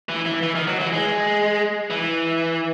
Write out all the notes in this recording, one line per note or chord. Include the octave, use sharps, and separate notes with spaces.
E3
E3
E3
D#3
F#3
E3
G#3
E3